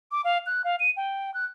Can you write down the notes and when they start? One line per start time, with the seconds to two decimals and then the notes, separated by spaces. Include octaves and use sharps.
0.12 D6
0.25 F5
0.46 F#6
0.64 F5
0.80 D#7
0.97 G5
1.34 F#6